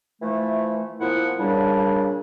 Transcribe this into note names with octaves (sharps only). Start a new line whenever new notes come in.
E3 F3 A3
A#2 F3 B3 E4 F#5
A#2 C#3 G3 D4